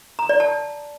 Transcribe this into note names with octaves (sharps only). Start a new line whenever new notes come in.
A#5
D5
A5